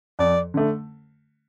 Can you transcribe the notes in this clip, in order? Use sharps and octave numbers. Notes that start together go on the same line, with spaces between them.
F2 D5
D3 A3